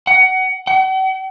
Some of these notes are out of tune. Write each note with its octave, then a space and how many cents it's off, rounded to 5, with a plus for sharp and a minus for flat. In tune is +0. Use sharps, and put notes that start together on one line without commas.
F#5 +20
F#5 +45